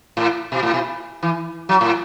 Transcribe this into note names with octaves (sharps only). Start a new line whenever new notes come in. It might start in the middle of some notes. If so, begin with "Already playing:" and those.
A2
B2
A2
B2
E3
F#3
A2